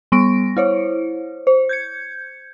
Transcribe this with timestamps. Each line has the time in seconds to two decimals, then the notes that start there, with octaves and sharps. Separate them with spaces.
0.12 G3 B3 C#6 A#6 D7
0.57 E4 C5 C#5
1.47 C5
1.69 G6 G#6 C#7